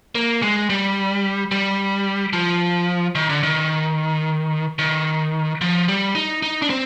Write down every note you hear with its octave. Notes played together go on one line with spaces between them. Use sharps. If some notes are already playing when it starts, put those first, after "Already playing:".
A#3
G#3
G3
G3
F3
D#3
D3
D#3
D#3
F3
G3
D#4
D#4
D4
C4